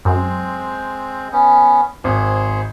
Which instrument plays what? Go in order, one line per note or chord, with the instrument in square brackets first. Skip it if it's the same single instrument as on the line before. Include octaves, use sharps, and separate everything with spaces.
[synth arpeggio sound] F#2 [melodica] G#3 C4
[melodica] B3 C#4
[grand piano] G#1 [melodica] G#4 C5